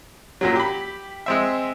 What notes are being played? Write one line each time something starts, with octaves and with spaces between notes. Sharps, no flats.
F#2 A#2 F#3
G4 B5
G#3 C4 E5